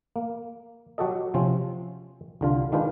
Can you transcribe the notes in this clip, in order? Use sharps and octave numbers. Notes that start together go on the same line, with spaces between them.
A#3
F#3 F#4 G4 A4 D#5
C3 F3 C4 C#4
C2 D3 F4
D#3 G#3 D4 F4 B4 C5